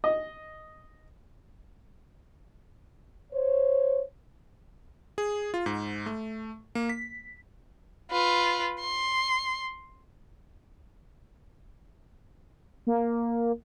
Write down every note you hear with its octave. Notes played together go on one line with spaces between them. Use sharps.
D#5
C5 C#5
G#4
F4
G#2
A3
A#3
B6
F4 B4
C6
A#3